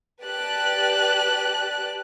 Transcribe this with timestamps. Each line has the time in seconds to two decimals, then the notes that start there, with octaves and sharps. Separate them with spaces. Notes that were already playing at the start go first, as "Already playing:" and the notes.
0.23 G4 B4 D5 A5 F#6